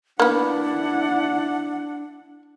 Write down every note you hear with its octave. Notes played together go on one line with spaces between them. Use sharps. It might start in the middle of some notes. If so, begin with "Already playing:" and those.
A#3 B3 D4 E4 F#5